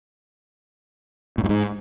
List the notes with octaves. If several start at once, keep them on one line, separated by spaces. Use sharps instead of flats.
A2
G2
G#2